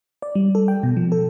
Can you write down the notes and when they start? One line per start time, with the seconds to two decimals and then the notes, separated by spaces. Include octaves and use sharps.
0.22 D5
0.35 G3
0.55 A4
0.68 G5
0.83 B2
0.97 F3
1.12 A4